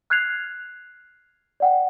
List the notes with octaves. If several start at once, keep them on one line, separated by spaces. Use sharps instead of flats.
F6 F#6 G#6 C7 F7
D5 F#5 G5